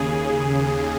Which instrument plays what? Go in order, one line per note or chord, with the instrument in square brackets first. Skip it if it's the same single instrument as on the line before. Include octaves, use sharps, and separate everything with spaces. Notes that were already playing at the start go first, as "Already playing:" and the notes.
Already playing: [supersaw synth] D#2 C#3 G#4